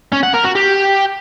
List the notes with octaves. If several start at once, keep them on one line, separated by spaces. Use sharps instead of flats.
C#4
F#5
A#4
F#4
G4